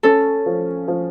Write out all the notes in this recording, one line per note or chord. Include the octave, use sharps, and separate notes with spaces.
C#4 A4
F3
F3